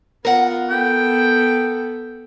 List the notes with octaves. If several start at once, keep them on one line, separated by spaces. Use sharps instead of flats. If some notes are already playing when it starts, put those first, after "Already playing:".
B3 F4 A#4 F#5
B3 A4 G5